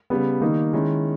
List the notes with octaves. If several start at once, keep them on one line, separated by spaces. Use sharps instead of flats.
C#3 G3 B3
D#3 G3 A#3 D#4
D#3 G#3 C#4 E4